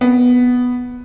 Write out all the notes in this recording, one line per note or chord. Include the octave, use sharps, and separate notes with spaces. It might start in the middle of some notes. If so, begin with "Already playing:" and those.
B3